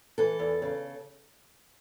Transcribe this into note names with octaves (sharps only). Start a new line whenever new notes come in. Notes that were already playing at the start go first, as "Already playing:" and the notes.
E3 A4
E2
C#3